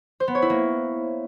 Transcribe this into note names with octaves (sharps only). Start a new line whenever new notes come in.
C5
B3
C#5
E4
A#3